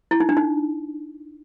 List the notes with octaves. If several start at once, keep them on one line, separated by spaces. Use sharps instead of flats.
E4
D#4
D4
D#4